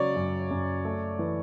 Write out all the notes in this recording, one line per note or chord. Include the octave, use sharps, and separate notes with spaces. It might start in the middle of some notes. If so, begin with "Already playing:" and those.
Already playing: C#3 F#3 C#5 D5
F#2
F#2
A3
E3